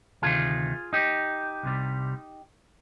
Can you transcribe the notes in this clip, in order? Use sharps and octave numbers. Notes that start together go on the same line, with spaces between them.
D2 C3 D#3 F4 G#4
D#4 G4
C2 C3 G3